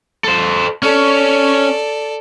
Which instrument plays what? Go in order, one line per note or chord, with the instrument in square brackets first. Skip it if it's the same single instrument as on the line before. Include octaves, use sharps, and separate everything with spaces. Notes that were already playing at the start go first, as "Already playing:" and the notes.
[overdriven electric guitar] A4 C5
[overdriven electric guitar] C#4 [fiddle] A4 D5